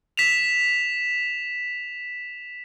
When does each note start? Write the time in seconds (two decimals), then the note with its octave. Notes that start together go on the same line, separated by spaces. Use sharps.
0.17 B6 E7 F7